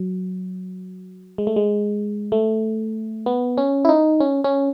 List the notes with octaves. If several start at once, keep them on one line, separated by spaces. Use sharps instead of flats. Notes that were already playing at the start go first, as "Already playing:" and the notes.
Already playing: F#3
G#3
A3
G#3
A3
B3
C#4
E4
D#4
C#4
C#4